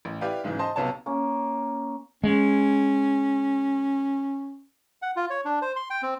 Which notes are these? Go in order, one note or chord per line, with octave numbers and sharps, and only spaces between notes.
A1
E4 G4 B4 D5 F5
B1 G#2 C#3 E3
C5 D#5 A5 C6
B1 C3 B3 C#5 A5
A#3 C#4
G#3 C#4
F#5
F4
C#5
D4
C5
C6
G5
C4